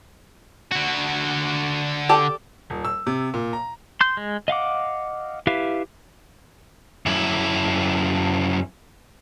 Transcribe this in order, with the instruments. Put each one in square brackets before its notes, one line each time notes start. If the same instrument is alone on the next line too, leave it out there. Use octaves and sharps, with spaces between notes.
[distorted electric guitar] D3 F#4
[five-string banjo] G4 A4 D5
[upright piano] D#1
E6
C3
A#2
A#5
[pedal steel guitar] C6 G6
G#3
D#5 F5 F#5 D6
E4 G4 B4 E5 F5
[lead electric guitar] F#2 E4